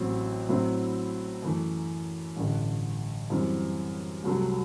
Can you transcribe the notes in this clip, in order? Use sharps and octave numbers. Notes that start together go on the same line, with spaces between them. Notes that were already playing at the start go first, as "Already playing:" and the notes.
Already playing: A1 A2 F#3 C4 G4
A2 F#3 C4 E4
F#2 E3 A3
A1 G2 D3
F#2 E3 G3 C4
C2 C3 F#3 A3